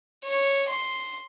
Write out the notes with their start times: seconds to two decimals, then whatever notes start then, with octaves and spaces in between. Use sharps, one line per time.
0.24 C#5
0.68 C6